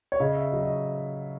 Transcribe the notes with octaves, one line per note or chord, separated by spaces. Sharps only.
C#5
C#3 D#5
E5
F#3 D#5
D#5